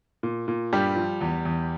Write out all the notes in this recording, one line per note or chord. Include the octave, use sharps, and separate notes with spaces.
A#2
A#2
G2 G3 G4
F3
E2
E2